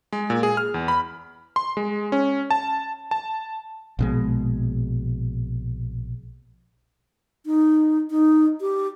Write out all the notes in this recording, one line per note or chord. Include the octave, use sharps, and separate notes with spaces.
G#3
A#2
G#4
F6
E2
B5
C6
G#3
C#4
A5
A5
A#1 B2 G#3
D#4
D#4
G4